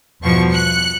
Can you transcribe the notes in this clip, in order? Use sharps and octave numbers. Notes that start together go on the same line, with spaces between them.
E2 G2 B2 F3 C#6
F#6 C#7